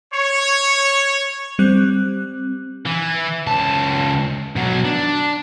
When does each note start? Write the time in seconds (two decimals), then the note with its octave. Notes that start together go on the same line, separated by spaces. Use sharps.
0.14 C#5
1.59 G3 C4 F#6
2.86 E3
3.47 C#2 A5
4.56 B2 F#3
4.85 D4